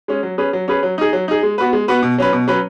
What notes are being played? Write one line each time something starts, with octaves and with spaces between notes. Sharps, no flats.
G#3 C#4
F#3
C#4 G#4 B4
F#3
C#4 G#4 B4
F#3
D#4 G#4
F#3
D#4 G#4
G#3
B3 F#4 B4
G#3
B3 F#4 B4
B2
F#3 C#4 B4
B2
F#3 C#4 B4